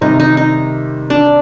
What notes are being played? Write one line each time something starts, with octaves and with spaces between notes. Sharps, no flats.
C3 D#3 G3 D#4
D#4
D#4
D4